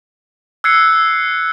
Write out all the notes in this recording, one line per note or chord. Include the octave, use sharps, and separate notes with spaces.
E6 F#6 G#6 C7 C#7